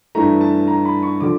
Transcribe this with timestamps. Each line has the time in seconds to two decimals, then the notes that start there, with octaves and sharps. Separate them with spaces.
0.15 G2 E3 A3 A#5
0.41 A5
0.68 A#5
0.85 B5
1.03 C#6
1.20 D3 F3 D6